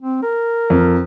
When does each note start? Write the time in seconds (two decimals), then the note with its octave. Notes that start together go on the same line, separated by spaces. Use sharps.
0.01 C4
0.22 A#4
0.70 F2